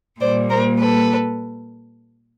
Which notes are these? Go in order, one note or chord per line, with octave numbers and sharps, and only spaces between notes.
A#2 G3 A#3 C5 D5
A#4 C5
A4 B4